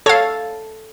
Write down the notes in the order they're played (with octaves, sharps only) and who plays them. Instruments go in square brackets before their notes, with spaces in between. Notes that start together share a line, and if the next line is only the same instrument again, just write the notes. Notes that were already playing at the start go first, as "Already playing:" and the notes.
[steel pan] A4 [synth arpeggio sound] C#5 F5